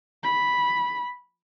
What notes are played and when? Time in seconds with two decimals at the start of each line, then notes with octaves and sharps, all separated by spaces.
0.23 B5